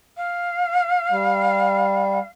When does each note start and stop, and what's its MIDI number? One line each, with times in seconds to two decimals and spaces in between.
0.17 2.28 77
1.11 2.19 55